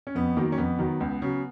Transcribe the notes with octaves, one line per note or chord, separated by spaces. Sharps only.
C#4
F2 B3
D#3 F#3 A#3
C#4
F2 B3
D#3 F#3
C#2
C#3 F#3